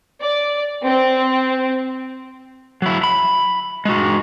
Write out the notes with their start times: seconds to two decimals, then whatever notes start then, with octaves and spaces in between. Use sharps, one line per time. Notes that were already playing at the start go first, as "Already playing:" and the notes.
0.22 D5
0.83 C4
2.82 F#3 E4
3.04 B5
3.85 G#3 F#4